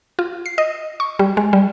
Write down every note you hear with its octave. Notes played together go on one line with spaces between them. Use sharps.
F4
C7
D#5
C#6
G3
G#3
G3